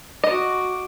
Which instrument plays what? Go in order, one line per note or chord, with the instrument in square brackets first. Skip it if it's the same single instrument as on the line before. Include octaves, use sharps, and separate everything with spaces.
[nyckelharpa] F#4 D6 [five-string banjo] D#5